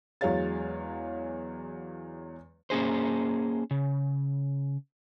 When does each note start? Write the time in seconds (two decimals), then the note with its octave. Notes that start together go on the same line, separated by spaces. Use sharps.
0.21 E2 F#3 G#3 C#5 F5 A6
2.70 A#3 C#4 G#4 C5
3.71 C#3